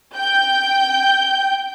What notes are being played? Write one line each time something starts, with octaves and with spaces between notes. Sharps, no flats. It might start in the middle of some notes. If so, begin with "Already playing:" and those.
G5 G6